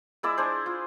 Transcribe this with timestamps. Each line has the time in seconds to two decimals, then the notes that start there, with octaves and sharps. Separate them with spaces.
0.23 G#3 E4 D5 E6
0.38 D4 G#4 C5
0.66 F4